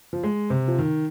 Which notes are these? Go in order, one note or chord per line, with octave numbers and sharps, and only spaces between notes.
F3
G#3
C3
F3
D#3